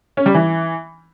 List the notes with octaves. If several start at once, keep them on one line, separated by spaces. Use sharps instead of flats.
C#4
G3
E3